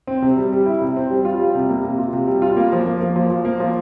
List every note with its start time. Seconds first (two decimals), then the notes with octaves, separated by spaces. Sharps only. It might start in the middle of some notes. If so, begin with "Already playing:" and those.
0.07 C4
0.22 C3
0.37 G3
0.52 G3
0.66 E4
0.82 C3
0.97 C4
1.11 G3
1.25 F4
1.40 G3
1.55 C3
1.70 A#3
1.84 C3
1.98 F4
2.13 C3
2.27 G3
2.42 F4
2.57 A#3
2.72 F3
2.86 A#3
3.01 A#3
3.16 F3
3.30 F3
3.45 A#3
3.60 F3